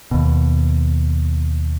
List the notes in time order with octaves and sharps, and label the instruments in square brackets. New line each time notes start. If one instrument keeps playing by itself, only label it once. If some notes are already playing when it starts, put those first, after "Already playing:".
[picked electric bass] D#2 B2